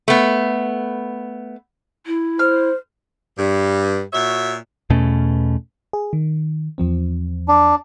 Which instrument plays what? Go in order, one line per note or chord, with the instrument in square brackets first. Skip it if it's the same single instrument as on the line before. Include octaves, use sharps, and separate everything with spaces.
[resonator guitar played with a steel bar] A3 B3
[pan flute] E4
[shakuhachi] C5 [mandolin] F6
[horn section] G2
A#2 F#4 C#5 E5
[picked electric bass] E2 B2 A3 C#4
[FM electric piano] G#4
D#3
E2 F3 C4
[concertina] D4